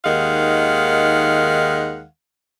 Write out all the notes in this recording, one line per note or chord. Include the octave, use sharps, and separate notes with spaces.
D#2 D#3 G#3 F5 F#5